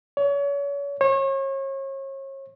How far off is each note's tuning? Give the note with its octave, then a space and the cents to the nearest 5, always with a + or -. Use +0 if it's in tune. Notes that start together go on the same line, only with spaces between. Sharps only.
C#5 +35
C#5 -35